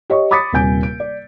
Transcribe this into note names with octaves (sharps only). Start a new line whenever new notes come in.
G4 C#5 D#5 C#6
B5 D6 D#6 A6 B6 C#7
D#1 C3 G3 G#5 G6 D7
D7
D5